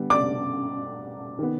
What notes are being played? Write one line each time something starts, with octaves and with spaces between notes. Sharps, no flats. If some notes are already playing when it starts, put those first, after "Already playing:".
Already playing: D3 G3 B3
D5 D6
D#3 B3